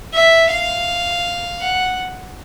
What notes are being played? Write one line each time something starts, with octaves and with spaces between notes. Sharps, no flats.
E5
F5
F#5